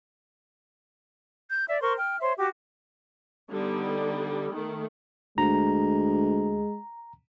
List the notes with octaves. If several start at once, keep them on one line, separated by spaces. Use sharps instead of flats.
G6
D5 E5
A#4 C5 C6 C#6
G5 F6
C5 C#5 E5 C6
F#4 G4 D6
D3 G3 B3 D#4
D#3 A3
D2 G#3 A#5